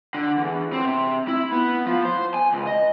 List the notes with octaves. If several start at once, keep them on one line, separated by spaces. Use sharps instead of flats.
D3
E2
C4
C3
E4
B3
F3
C5
G#5
C#2
D#5